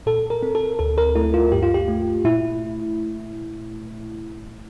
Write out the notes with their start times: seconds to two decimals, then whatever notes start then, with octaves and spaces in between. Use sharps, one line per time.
0.06 A#2 A4
0.30 A#4
0.42 C4
0.55 A4
0.79 D2 A4
0.98 A#4
1.15 A3 E4
1.34 F4
1.52 G2 G4
1.63 F4
1.74 G4
1.88 A3
2.25 A#2 E4